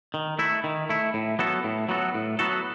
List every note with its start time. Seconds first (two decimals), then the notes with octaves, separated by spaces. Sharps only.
0.14 D#3
0.39 A3 E4
0.64 D#3
0.89 A3 E4
1.14 A2
1.39 F#3 B3 F#4 A4
1.64 A2
1.89 F#3 B3 F#4 A4
2.14 A2
2.39 F#3 B3 F#4 A4